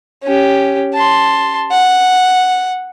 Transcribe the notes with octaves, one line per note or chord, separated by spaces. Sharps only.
C#4 G4
A5 C6
F#5